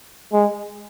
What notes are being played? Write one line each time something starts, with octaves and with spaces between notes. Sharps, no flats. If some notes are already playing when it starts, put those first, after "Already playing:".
G#3